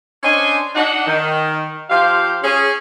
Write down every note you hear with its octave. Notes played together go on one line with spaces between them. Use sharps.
C#4 D4 C5 D#5 G#5
D4 D#4 F#5
D#3
F3 G4 C5 F5
C#4 G#4